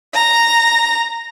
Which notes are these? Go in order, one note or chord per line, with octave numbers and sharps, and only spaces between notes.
A#5